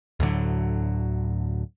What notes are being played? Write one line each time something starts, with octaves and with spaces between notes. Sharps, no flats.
D2 A2 D3 F#3